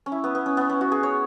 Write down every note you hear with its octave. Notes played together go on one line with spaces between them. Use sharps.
C#4
E4
B3
B3
C#4
B3
C#4
F#4
G#4
C#5